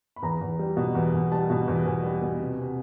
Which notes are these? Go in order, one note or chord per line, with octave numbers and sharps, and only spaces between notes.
B5
E2 A#5
E2
G3
B2
E2
E2
G3 A5
B2
E2
E2 G#5
G3
B2
C3
C3